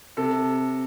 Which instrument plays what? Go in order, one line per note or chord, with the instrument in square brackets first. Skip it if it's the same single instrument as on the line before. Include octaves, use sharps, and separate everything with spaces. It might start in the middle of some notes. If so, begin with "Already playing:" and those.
[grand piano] C3 A4